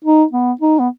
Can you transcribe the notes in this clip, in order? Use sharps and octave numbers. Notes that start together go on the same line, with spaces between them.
D#4
B3
D#4
B3